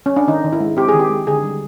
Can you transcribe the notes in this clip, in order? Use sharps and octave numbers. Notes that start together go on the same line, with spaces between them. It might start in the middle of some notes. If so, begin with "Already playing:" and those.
C#4
D4
D#3 D#4
D#3
E4
G#3
C4 G4
G#4
D#3
G4
G#3
D3 G#4
G3